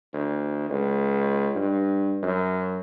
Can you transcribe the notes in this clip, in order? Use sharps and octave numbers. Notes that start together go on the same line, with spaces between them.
D2
C#2
G2
F#2